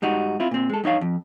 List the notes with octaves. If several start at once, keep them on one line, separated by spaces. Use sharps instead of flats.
G#2 G3 D#4 F#4
C4 E4 F4
A#2 C4
G#3 A4
G2 D#4 C#5 F5
F2